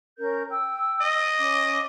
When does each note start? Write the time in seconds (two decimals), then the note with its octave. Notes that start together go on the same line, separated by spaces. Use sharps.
0.19 C#4 A#4 G6
0.50 G5 E6
1.01 D#5
1.39 C#4 D6